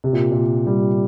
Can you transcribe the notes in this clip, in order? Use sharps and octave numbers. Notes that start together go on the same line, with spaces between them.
C3
A#2
A#2
G3